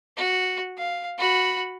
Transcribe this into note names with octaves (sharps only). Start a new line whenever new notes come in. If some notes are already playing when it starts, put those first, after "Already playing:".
F#4
F5
F#4 B5